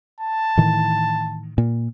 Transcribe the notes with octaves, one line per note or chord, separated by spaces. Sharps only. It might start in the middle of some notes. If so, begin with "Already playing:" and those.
A5
A2 D#3 E3
A#2